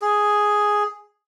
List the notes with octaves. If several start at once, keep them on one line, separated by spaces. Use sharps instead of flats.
G#4